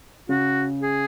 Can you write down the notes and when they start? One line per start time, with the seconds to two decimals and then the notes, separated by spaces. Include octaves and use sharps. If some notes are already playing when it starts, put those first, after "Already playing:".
0.29 C#3 F#4
0.82 G#4